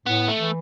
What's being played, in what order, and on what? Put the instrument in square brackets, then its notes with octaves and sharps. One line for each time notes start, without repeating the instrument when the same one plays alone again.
[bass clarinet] A2 [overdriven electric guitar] B3
[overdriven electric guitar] A3
[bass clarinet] E3